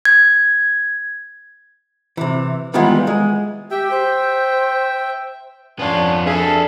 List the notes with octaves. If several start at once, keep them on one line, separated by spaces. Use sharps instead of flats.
G#6
C3 E3
D#3 E3 G3 G#3 B3 F4
G#3
G4 E5 G5
C5
F2 B3 C#4 D4 F4
D4 G#4 A4 E5 F5